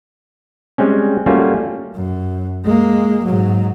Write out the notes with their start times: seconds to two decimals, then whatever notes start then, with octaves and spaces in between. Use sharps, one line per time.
0.78 G3 G#3 C4 C#4
1.26 G3 A3 A#3 C#4 F4 F#4
1.95 F#2
2.64 G#3 A#3
3.24 G#2 F#3